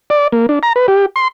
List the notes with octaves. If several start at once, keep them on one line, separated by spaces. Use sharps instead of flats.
D5
A#3
D4
A#5
B4
G4
C6